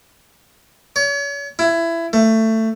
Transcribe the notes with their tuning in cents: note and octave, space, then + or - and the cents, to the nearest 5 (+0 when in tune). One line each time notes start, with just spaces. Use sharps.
C#5 +40
E4 +20
A3 +15